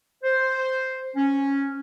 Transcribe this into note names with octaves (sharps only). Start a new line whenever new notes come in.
C5
C#4